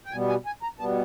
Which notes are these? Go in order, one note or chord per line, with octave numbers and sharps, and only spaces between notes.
G5
B2 G3 B3 G#5
G#5
G#5
A#5
B2 G3 B3 A5